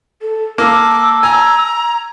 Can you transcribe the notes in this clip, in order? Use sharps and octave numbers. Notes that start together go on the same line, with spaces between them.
A4
A#3 A5 D6 E6
G#5 A#5